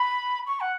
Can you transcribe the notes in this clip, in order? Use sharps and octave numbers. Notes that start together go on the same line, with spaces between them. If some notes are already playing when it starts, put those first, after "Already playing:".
Already playing: B5
C#6
F#5